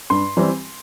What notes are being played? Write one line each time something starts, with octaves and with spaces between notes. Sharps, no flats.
G2 C6
E3 G3 C4